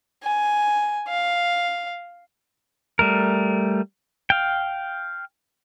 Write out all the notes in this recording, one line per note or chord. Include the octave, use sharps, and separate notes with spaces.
G#5
F5
G3 A3 A#4
F5 G5